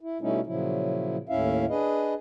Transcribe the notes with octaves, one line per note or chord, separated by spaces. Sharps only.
E4
B2 G3 A3 C#4 D#4 E4
A#2 C#3 F3 F#3 E4
D#2 A2 C#4 E4 E5 F5
D4 G#4 B4 D#5